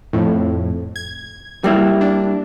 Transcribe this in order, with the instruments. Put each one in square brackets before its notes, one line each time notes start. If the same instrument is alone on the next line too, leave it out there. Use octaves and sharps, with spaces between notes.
[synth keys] F2 A2
G#6
[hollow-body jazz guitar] G3 A#3 E4
[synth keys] D4